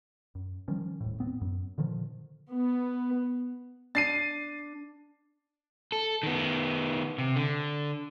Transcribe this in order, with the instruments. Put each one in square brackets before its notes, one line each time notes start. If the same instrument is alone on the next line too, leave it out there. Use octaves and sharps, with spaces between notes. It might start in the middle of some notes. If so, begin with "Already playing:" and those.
[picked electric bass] F#2
D#3 F3 G3 C#4
D#1 A2
D#2 B3 C4
F#2
A#2 D3 D#3 F3
[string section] B3
[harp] D4 [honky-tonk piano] A6 C7 D#7
[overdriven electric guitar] A4
D#3 B3
C3
D3